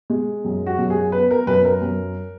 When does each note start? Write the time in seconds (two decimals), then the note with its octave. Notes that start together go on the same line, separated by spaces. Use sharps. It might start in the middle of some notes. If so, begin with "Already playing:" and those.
0.10 G#3
0.45 F#2
0.66 F#4
0.79 F#2
0.90 G#4
1.12 B3 B4
1.31 A#4
1.47 F#2 B4
1.65 A#4
1.82 F#2